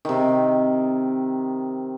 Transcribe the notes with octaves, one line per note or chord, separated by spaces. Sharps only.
C3 D#3